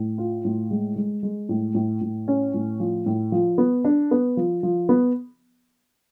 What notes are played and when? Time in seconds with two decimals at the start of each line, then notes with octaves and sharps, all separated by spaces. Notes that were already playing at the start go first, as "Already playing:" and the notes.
Already playing: A2
0.18 F4
0.45 A2
0.71 G#3
0.96 G#3
1.23 G#3
1.49 A2
1.75 A2
2.01 A2
2.28 C#4
2.54 A2
2.80 F3
3.06 A2
3.32 F3
3.58 B3
3.85 D4
4.11 B3
4.37 F3
4.63 F3
4.89 B3